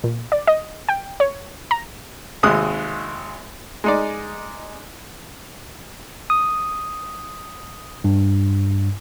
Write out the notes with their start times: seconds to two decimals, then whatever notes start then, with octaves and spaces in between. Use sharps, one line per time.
0.04 A#2
0.32 D5
0.47 D#5
0.89 G5
1.20 C#5
1.71 A#5
2.43 G#1 D#2 C3 G#3 D#6 F#6
3.84 G#3 D#4 D5
6.30 D#6
8.04 G2